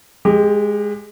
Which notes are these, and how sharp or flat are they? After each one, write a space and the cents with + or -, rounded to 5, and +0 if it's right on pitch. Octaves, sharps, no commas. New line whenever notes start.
G#3 +0 G4 +25